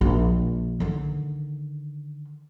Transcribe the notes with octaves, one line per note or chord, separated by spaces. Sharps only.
A#1
D3 D#3